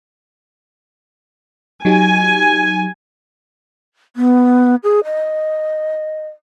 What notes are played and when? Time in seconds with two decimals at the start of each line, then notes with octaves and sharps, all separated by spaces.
1.85 F#3 D#4 G4 G#5
4.16 B3
4.83 G#4
5.05 D#5